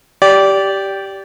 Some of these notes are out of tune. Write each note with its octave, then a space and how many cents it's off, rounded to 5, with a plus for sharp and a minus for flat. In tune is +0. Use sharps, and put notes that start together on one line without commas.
G4 -5 D5 -20